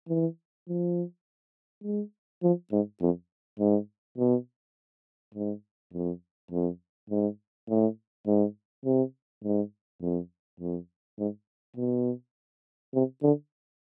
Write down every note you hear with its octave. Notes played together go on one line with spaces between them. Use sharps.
E3
F3
G#3
F3
G#2
F2
G#2
B2
G#2
F2
F2
G#2
A2
G#2
C3
G#2
F2
F2
G#2
B2
C3
D3